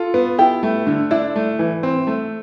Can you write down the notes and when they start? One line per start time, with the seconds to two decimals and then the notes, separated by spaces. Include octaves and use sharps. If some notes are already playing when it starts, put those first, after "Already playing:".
Already playing: F4 A4
0.14 B3
0.39 E4 G4
0.63 A3
0.87 D3
1.11 D4 E4
1.36 A3
1.59 E3
1.83 C4
2.07 A3